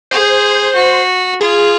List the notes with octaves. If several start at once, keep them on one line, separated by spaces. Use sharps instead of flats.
G#4 C5
F#4
F4 G#4